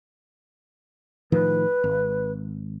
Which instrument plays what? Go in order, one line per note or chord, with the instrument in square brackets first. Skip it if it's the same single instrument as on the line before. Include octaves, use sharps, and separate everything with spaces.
[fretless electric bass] A2 D#3 F3 [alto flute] B4
[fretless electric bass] G#1